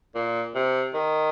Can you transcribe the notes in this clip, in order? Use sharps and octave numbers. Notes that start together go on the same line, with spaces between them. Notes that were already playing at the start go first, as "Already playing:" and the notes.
A#2
C3
D#3